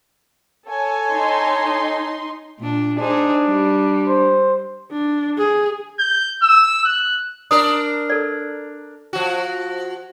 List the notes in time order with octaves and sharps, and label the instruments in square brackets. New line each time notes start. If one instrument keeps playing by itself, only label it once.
[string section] A4 C#5 G#5
[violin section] D#4 C6
[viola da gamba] A#2 D4
[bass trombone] D4 [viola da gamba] D#4 G#4 C5
[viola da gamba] G3
[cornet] C5
[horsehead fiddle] D4
G#4
[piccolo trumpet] G6
E6
F#6
[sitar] D4 A#4 [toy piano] D#6
[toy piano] A4 D5
[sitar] F3 F#4